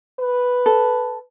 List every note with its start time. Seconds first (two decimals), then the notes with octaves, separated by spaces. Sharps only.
0.20 B4
0.66 A4